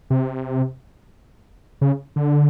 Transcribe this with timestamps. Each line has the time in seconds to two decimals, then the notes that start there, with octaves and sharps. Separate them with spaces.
0.10 C3
1.81 C#3
2.16 D3